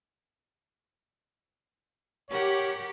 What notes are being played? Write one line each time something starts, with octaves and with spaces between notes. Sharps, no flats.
G4 A#4 C#5 F#5